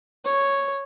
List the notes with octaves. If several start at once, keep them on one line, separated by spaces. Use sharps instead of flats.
C#5